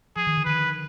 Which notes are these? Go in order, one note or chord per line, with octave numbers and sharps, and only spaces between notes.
F3 G#4
D#3
D3
D#3 B4